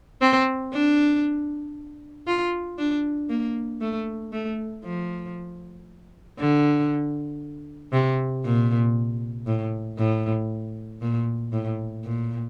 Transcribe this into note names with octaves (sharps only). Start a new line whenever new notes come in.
C4
D4
F4
D4
A#3
A3
A3
F3
D3
C3
A#2
A2
A2
A#2
A2
A#2